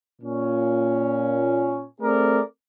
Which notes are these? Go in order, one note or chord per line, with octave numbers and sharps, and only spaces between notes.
A#2 C#4
A3 C4 G#4 A#4 D5